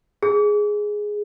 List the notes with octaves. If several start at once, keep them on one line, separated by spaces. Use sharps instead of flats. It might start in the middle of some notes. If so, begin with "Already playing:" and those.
G#4